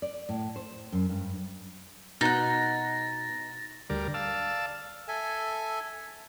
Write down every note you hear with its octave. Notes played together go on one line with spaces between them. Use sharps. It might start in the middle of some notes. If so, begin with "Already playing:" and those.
D5
A2
C5
F#2
G2
B2 D#4 F#5 A6 A#6
D2 G3 A#4 D5
D5 F5 A5 E6
A4 E5 G#5